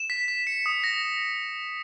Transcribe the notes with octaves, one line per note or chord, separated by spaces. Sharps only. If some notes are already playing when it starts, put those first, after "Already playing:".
Already playing: E7
B6
B6
C#7
D#6
A#6